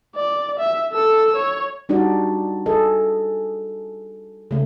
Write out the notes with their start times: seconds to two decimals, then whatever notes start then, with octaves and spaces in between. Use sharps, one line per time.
0.16 D5
0.59 E5
0.92 A4 E6
1.36 C#5
1.89 G3 D4 D#4 F#4 D5
2.66 G#4 A4 D#5
4.51 C#3 A3